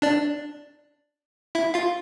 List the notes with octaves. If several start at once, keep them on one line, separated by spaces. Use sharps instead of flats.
D4 D5
E4 E5
F4 F5